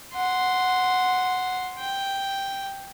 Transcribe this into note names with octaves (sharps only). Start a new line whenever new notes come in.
F#5 C6
G5